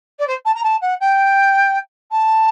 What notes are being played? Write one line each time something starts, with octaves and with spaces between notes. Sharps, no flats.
D5
C5
A5
A#5
A5
F#5
G5
A5